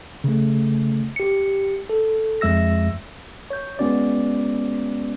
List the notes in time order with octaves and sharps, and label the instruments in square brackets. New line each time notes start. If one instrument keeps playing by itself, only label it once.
[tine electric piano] C#3 A3
G4 C#7
A4
F2 G#3 E5 E6 A#6
C#5 G6
G#3 B3 C#4 F#4 D5